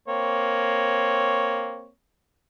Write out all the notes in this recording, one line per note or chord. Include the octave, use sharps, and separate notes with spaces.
A#3 C4 C#5